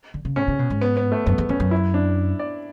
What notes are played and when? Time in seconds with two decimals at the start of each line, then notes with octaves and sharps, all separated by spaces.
0.14 D3
0.25 C#3
0.36 A2 C#4
0.48 C#3
0.59 B2
0.70 G#2
0.81 B3
0.97 B3
1.12 A3
1.26 F#2 B3
1.38 E2
1.49 E2 C#4
1.60 F#2
1.71 E4
1.94 D4
2.39 D5